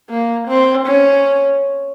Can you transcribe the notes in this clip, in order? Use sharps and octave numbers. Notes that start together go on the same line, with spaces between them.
A#3
C4
C#4